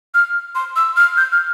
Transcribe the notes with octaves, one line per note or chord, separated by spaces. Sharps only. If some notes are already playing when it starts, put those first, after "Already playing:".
F6
C6
E6
F6
G6
F6